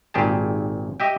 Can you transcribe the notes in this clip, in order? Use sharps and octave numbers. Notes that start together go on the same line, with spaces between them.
G#1 A#2 G4 G#4 A5
G4 D#5 E5 G5